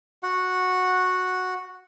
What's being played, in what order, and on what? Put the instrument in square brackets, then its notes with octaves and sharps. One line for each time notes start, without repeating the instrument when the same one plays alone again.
[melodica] F#4 F#5